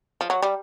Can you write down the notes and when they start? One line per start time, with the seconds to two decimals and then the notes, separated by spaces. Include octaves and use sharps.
0.21 F3
0.30 F#3
0.42 G3